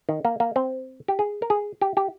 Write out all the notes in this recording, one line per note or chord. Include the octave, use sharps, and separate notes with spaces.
D#3
A#3
A#3
C4
G4
G#4
A#4
G#4
G4
G4